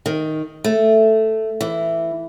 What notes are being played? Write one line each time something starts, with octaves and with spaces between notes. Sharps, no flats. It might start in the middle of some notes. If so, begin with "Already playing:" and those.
D#3
A3
E3